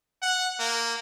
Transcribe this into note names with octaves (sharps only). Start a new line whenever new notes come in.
F#5
A#3